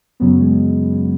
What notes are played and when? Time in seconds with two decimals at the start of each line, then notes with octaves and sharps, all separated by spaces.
0.20 F#2 C#3 F#3 B3
0.40 G#3